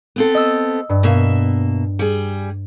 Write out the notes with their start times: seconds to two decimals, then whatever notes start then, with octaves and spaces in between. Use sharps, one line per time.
0.16 B3 C4 A4
0.34 D#5 E6
0.89 G2
1.03 B2 A#3 E5
1.99 G3 G#4